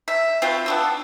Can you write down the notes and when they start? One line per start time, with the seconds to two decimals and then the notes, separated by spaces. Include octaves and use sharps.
0.08 E5
0.42 C4 F4 F#4 B4
0.66 B3 D4 E6